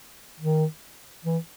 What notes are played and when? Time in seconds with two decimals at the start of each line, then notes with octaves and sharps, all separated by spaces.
0.40 D#3
1.25 E3